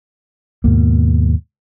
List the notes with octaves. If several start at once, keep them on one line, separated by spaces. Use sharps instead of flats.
D#2 G#2 B2 A#3